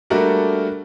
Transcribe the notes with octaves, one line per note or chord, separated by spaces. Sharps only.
G3 A3 A#3 D4 F#4 A#4